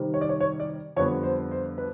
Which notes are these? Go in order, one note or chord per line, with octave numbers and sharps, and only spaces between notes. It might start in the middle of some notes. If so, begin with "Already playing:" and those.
Already playing: C3 D#3 G3 C4
C#5
D5
C#5
C#5
D5
F2 D3 G3 B3 C#5
C5
C5
B4